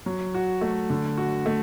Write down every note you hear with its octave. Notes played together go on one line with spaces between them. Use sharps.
F#3
F#4
A3
D3
F#4
A3